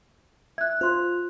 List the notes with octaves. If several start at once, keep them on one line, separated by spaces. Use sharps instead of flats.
E5 F#6 G#6
F4 C5 C6 F#6